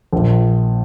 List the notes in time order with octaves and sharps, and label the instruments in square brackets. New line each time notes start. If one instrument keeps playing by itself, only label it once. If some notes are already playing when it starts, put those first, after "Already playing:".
[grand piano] A#1 A#2